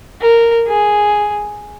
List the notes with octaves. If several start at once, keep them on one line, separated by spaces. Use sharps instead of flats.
A#4
G#4